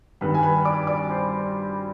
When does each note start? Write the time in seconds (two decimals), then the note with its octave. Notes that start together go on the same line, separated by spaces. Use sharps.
0.21 G2 D#3 G3 B4 B5
0.34 G#5
0.43 B4 B5
0.65 D5 D6
0.87 D5 D6
1.09 C5 C6